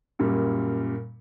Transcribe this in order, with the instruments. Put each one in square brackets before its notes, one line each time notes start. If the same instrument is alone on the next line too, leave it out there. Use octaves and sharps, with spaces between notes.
[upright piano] F#2 A#2 G3